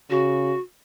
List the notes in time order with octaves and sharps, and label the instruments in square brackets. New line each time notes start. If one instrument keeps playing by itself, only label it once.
[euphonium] C#3 [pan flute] F#4